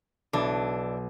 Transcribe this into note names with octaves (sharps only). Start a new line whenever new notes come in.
B1 E3 D4